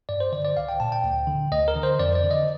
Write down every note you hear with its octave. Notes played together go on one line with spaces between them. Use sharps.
G2 D5
C5
D3 D5
D5
C2 F5
G5
A#2 A5
G5
D2
D3
D2 D#5
A#4
D3
C5
F2 D5
D5
D3
D#5